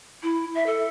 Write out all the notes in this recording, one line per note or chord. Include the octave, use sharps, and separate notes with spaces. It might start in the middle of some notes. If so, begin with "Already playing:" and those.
E4
E5
A4